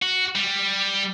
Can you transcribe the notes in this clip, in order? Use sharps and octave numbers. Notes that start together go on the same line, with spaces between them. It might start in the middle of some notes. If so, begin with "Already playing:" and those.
F#4
G3